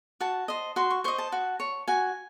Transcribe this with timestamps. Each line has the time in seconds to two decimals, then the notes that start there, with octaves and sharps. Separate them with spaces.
0.21 F#4 A5
0.48 C5 D#5
0.76 F#4 C6
0.90 C#6
1.04 C5 D#5 C#6
1.18 A5
1.32 F#4
1.60 C#5
1.88 F#4 G#5